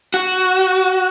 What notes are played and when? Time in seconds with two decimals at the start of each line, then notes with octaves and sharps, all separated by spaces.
0.14 F#4